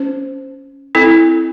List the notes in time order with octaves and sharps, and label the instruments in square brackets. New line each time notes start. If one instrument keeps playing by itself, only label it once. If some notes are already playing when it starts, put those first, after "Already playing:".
Already playing: [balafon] C#4 C5
C4 E4 A4